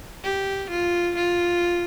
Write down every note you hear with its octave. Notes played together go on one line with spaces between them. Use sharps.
G4
F4
F4